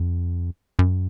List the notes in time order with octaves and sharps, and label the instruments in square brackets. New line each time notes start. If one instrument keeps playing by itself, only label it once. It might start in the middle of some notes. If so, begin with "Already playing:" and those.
Already playing: [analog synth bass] F2
F#2